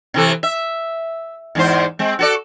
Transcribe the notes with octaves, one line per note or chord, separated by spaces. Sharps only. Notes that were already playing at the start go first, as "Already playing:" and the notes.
C3 E3 A4
E5
E2 G#2 C5
G#3 C4
F#4 A4 D5